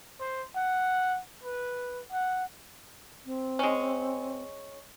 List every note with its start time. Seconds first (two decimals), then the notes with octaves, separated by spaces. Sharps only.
0.20 C5
0.55 F#5
1.44 B4
2.11 F#5
3.26 C4
3.59 G#3 C#4